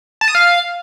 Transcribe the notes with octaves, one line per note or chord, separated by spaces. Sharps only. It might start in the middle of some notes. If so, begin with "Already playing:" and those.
A5
D#6
F5